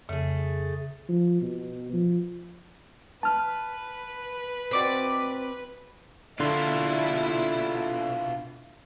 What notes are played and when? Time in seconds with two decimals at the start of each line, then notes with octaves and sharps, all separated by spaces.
0.09 F2 C#3 A3 G#4
1.09 F3
1.42 B2
1.93 F3
3.23 B4 A5 F6
4.71 C4 D#4 F#4 D5 D6 B6
6.40 B2 D3 D4 E4 F4 C6